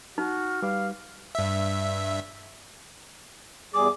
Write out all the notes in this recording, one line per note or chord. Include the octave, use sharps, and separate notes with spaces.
D#4 F#4 F6
G3 B4 F5 D6
G2 E5
E2 G3 G#4 D6